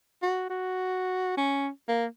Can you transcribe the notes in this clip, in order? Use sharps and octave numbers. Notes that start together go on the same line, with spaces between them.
F#4
F#4
C#4
A#3